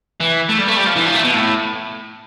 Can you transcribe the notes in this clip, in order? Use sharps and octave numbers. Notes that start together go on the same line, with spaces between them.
E3
A3
G3
A3
G3
F3
E3
F3
A3
B2
A2